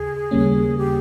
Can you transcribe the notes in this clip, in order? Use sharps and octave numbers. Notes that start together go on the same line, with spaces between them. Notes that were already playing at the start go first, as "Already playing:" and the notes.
Already playing: D#2 C#3 G#4
D#2 C#3 G3 A#3 C#4
G4